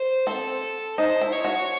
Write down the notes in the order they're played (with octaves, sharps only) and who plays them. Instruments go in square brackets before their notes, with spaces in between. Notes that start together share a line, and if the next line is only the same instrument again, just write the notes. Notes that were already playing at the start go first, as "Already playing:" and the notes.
Already playing: [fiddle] C5
[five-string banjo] C4 [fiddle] A4
[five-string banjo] D#4 [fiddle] C5
[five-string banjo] E4
[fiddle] C#5
[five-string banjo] F#4